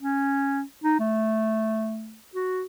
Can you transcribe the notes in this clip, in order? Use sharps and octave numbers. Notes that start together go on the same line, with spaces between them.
C#4
D#4
A3
F#4